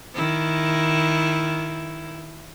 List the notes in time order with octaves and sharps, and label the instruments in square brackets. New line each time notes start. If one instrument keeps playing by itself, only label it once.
[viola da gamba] D#3 E4